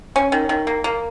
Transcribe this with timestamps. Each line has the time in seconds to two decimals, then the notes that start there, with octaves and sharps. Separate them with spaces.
0.16 C#4
0.32 D#3
0.49 D#3
0.67 A#3
0.84 A#3